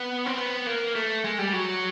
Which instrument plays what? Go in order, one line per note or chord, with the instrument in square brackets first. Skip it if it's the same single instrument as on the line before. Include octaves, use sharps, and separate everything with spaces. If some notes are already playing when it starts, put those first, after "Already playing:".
Already playing: [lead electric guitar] B3
C4
B3
A#3
A3
G#3
G3
F#3